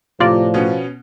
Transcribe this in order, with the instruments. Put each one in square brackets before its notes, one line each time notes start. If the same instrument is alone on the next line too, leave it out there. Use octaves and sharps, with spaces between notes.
[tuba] A2 [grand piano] C3 [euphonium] F3 [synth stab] F4 D5
[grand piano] B2 B3 C#4